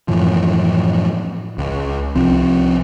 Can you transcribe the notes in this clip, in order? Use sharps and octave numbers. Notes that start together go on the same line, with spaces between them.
F#2 A2 E3 F3
C#2
C2 F3 C4